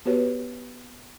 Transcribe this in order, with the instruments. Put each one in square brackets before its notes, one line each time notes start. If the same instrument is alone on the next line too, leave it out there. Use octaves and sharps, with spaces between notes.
[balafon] B3 F#4 G4 B4 C#5